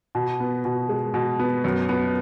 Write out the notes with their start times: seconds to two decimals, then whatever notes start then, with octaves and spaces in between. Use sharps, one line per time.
0.15 B2
0.40 B3
0.65 B2
0.89 G#3
1.14 B2
1.39 B3
1.64 F#2
1.89 B3